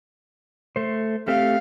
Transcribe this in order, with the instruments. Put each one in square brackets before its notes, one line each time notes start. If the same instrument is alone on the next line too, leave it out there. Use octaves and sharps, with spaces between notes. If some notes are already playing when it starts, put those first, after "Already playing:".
[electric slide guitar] A3 C5
[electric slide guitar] A3 C4 G4 [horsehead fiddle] F5